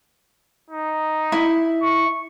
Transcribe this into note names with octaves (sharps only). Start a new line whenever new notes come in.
D#4
E4
C#6